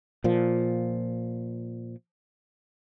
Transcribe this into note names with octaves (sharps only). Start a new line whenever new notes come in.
A#2 F3